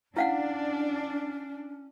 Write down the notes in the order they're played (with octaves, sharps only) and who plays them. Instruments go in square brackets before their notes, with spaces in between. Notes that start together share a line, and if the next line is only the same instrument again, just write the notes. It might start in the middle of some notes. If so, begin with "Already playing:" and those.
[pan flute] C#4 [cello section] D4 [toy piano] E4 F5 F#5